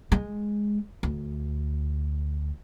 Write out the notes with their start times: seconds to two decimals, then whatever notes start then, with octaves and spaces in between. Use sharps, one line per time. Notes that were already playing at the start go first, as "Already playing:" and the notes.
0.12 G#3
1.03 D2